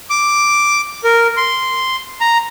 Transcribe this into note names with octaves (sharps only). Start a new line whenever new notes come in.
D6
A#4
C6
A#5